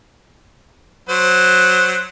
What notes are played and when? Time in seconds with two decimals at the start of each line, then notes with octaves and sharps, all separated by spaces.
1.09 F#3 C5